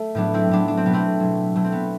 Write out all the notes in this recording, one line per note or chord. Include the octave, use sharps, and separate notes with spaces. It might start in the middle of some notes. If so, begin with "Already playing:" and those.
Already playing: A3
A2 F#3 B3 D4
C4 E4
A2 F#3 B3 D4
D4
C4
B2 F#3 B3
A3 C4
B2 F#3
B2 F#3 A3
C4
B3